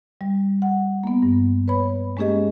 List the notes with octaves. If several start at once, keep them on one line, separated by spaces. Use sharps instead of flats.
G3
F#5
A#3 B3
G2
B4 C#5 B5
G#3 A#3 C#4 G4 G#4 D#5